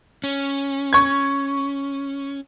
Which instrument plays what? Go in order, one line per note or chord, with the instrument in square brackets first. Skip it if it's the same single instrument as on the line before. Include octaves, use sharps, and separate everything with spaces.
[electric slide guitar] C#4
[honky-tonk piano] C#6 G#6